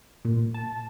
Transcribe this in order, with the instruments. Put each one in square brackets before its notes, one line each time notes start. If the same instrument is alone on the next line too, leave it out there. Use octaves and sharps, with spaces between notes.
[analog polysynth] A#2
A5